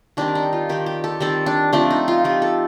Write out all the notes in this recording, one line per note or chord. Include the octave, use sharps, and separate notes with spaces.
D#3 G3 C4 D4
D#4
F4
D#3 G3 C4 G4
G4
A4
D#3 G3 C4 A4
D4
F3 A3 C4 D4
D#4
F4
F3 A3 C4 G4
A4